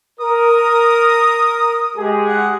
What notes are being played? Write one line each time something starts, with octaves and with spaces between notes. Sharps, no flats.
A#4 D#6
G#3 G4 G#4
F#5